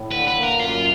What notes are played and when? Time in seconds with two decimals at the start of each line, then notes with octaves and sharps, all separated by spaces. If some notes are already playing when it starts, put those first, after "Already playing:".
Already playing: A2
0.12 D3 B4
0.28 B4
0.35 A#3
0.43 A#4
0.60 F#2 F4